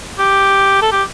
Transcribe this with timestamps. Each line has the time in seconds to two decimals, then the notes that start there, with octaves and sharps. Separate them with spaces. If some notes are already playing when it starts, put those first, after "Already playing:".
0.19 G4
0.82 A4
0.92 G4